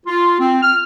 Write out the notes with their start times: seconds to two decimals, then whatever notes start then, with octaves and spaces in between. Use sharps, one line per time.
0.06 F4
0.38 C4
0.61 F6